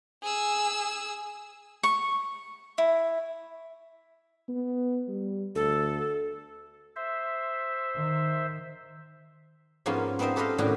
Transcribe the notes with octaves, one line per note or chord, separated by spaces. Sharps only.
G#4 E6
C#6
E4
B3
G3
D2 A4
C5 E5
D#3
G#2 F3 A#3 B3 C#4 F4
B3 C4 D#4 C5 D#5 E5
G4 A4 B4 C5 D#5 F5
A2 C3 D#3 C#4 D4 F#4